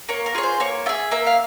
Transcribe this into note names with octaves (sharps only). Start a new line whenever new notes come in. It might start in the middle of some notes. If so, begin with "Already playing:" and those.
A#3 C#5
A#4
F4 G#4 C#5
C5
A#3 C#5
F4 G#4 E5
A#3 E5
F5